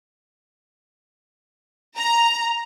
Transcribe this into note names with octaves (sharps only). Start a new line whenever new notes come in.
A#5